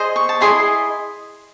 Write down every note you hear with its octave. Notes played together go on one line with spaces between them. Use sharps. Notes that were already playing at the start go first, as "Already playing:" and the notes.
Already playing: G#4 C5 D#5
C#6
A5
E4 G#4 D#5 C6